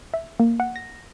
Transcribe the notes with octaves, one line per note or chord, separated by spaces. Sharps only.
E5
A#3
F#5
A#6